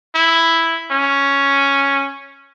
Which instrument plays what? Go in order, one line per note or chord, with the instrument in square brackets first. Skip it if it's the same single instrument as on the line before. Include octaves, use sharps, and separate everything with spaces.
[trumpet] E4
C#4